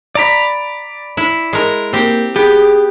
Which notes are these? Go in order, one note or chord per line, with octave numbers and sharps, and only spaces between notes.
D5 A#5 B5
E4
G#3 A#4
A#3 C4 G4
B3 G4 G#4